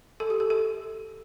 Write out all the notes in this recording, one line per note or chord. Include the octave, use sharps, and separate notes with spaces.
A4
G4
A4
A4